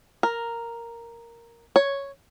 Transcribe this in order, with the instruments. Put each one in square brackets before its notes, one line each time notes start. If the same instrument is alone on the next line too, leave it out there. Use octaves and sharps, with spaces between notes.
[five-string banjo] A#4
C#5